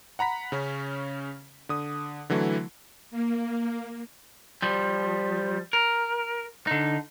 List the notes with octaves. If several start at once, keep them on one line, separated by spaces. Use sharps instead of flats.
F#5 A#5 B5 B6
C#3 C#4
D3 D#6
D3 E3 F#3 A3 E4
A#3
F3 G3
A#4
D3 D#4